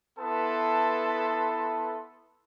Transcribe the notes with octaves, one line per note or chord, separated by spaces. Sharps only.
B3 E4 A4 B4 A5 C6